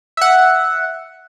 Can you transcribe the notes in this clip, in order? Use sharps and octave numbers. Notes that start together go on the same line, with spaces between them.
E5 F#5